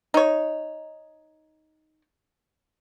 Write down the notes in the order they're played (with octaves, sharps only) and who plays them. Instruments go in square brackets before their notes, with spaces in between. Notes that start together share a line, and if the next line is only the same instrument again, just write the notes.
[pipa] D#4 C#5